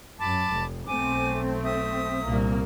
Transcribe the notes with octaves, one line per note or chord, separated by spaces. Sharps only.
F#2 A5 B5 D6
F1
B1 A3 C4 G#5 D6
E5 D#6
C2 A#2 A#3